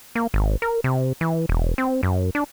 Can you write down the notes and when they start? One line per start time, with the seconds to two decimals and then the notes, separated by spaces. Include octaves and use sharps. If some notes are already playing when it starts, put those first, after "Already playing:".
0.15 A#3
0.34 G#1
0.62 A#4
0.84 C3
1.21 E3
1.49 E1
1.78 C4
2.03 F#2
2.35 D4